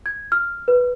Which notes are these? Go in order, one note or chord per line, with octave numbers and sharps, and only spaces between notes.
G#6
F6
B4